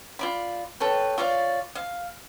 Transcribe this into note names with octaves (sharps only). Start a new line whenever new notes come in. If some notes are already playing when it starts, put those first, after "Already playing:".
F4 D5 B5
A4 B4 C#5 G5
F4 C#5 D5 F5
F5